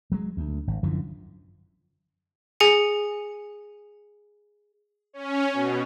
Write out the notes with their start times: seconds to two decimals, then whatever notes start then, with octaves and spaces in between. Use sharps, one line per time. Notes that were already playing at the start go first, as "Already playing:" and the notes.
0.12 F#3 G#3
0.37 D2
0.67 G#1
0.83 F#2 D3 E3 F3
2.60 G#4 G#5 C#7
5.13 C#4
5.53 B2